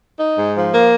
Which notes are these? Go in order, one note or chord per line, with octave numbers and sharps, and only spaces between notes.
D#4
G#2
F3
A#3